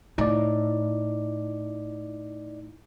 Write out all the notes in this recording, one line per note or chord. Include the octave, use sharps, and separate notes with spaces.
A2 D#4 D5